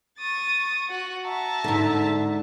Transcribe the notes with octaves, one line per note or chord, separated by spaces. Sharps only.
C#6 D#6 A6
F#4
E5 A5 A#5
G#2 D3